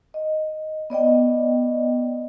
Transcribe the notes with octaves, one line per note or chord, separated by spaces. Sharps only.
D#5
B3 D5 D#5 G5